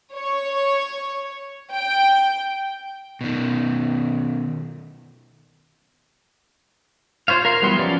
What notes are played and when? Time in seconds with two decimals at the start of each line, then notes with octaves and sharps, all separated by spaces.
0.14 C#5
1.72 G5
3.21 B2 D#3
7.28 F4 C5 C#5 F5
7.45 A#4 F5 C6
7.62 E3 F#3 G3 B3 C6
7.79 F3 C#4 D5 D6